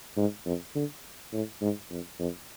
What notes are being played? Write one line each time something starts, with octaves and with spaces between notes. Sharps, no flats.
G#2
F2
D3
A2
G#2
F2
F2